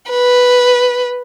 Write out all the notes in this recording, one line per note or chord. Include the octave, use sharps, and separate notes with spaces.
B4